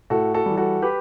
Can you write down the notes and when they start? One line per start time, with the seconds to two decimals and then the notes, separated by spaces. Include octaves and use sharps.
0.10 A2 F#4 A4
0.34 F#4 A4
0.46 E3 G3
0.57 F#4 A4
0.82 G4 B4